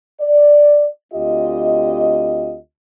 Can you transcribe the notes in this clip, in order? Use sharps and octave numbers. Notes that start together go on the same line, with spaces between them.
D5
D2 C4 F4 G4 D#5